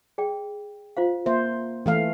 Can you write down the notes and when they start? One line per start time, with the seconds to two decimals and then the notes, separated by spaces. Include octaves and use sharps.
0.18 G#4 D5 G5
0.97 F4 C5 F5
1.26 A#3 C5 E5
1.86 E3 A3 C#4 F5